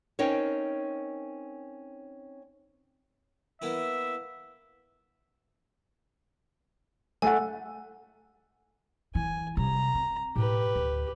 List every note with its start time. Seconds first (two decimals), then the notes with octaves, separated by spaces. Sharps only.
0.19 C4 C#4 D#4 A#4 C#5
3.62 A#3 B3 E4 E5
7.22 A3 A4 F#5 G#5
9.15 E3 G#5
9.57 C3 G3 A#5
9.95 C4
10.36 A2 G4 B4
10.76 D2